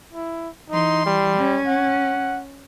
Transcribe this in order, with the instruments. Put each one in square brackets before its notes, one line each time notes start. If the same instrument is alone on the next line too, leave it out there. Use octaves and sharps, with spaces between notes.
[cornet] E4
[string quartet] E3 C6 [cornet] D#4
[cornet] G3
[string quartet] C#4
[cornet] F#5